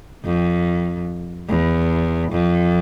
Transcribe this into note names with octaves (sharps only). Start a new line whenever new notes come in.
F2
E2
F2